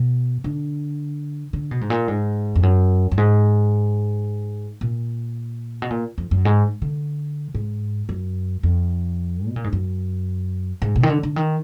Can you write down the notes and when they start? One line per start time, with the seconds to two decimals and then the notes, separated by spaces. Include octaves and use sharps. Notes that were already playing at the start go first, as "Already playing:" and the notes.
Already playing: B2
0.44 D3
1.53 D3
1.71 B2
1.81 G#2
1.90 A#2
2.08 G#2
2.56 F2
2.63 F#2
3.12 F#2
3.18 G#2
4.81 A#2
5.82 B2
5.90 A#2
6.18 F2
6.31 F#2
6.45 G#2
6.82 D3
7.54 G#2
8.09 F#2
8.63 F2
9.48 B2
9.56 A#2
9.64 G#2
9.73 F#2
10.82 G#2
10.96 B2
11.03 D#3
11.09 D3
11.23 D3
11.36 D#3